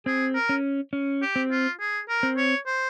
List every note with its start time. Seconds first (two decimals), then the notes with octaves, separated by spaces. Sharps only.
0.06 C4 G#4
0.35 A#4
0.49 C#4
0.93 C#4
1.22 G4
1.36 C4
1.51 F4
1.80 G#4
2.09 A#4
2.23 C4
2.37 C#5
2.66 C5